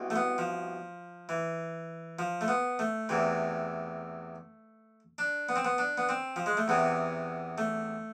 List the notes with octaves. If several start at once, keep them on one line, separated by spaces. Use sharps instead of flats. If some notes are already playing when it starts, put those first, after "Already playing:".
Already playing: C2 B2
A3
B3
F3
E3
F3
A3
B3
A3
E2 C3 E3
D4
B3
C4
B3
D4
B3
C4
F3
G#3
A3
E2 C3 E3 B3
A3